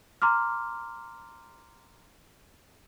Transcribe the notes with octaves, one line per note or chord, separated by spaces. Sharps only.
A#5 C6 D6 F6